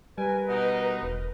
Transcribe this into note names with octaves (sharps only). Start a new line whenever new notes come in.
G3 A#4 B4 G#5
B2 D#4
E1